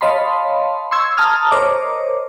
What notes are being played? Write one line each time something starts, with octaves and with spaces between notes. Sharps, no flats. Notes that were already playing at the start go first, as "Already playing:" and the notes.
C#5 D#5 F5 A5 B5 C6
C6 C#6 E6 G#6
A5 A#5 D#6 F6
A#4 C5 C#5 D#5 D6